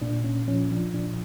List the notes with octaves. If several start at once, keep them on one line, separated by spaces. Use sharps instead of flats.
A#2 D4
A#2 C#4
F3 C#4
F3 D4
A#2 D4